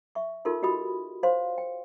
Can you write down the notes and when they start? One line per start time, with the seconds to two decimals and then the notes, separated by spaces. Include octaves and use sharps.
0.15 E5 C#6
0.45 D#4 F4 A4 A#4 C6
0.62 F#4 G4 D#5 B5 D#6
1.23 C5 C#5 F5 C6
1.58 G5